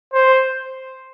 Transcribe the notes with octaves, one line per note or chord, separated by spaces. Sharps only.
C5